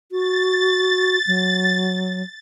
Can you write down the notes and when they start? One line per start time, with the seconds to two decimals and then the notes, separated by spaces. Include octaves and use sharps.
0.11 F#4 A6
1.27 F#3